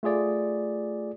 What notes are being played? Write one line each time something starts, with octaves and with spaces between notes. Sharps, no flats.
A3 F4 G#4 D5